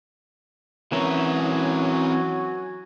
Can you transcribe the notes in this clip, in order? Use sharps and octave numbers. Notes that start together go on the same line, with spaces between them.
E3 F#3 C4 C#4 F#4 A#4 G#5